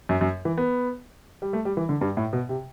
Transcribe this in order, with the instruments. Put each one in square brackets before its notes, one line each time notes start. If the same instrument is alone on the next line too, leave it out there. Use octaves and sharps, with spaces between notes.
[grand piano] F#2
F#2
E3
B3
G3
A3
G3
E3
D3
G2
A2
B2
C3